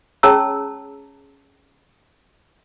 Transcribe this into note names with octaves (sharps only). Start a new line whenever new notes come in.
C#4 G#4 C#5 A5 A#5 E6